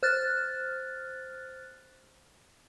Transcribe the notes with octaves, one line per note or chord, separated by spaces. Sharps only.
C5 F6 F#6 A6